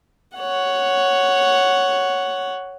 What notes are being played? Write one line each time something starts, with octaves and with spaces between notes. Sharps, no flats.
C#5 F#5